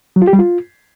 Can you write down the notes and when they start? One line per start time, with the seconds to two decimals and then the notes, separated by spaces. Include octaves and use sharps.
0.16 F#3
0.22 F4
0.27 G4
0.33 G3
0.39 F4